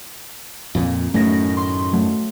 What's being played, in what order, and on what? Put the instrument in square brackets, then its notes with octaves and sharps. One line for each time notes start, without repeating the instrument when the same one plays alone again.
[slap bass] F2 A#2
[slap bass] F#2 A2 D#3 [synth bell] A3 A#6
[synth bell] C6
F#3 A3